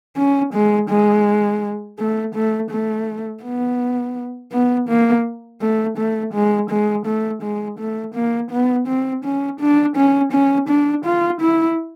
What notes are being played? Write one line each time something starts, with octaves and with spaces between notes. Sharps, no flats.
C#4
G#3
G#3
A3
A3
A3
B3
B3
A#3
A3
A3
G#3
G#3
A3
G#3
A3
A#3
B3
C4
C#4
D4
C#4
C#4
D4
F4
E4